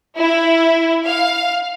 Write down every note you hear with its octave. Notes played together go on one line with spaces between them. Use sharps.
E4
F5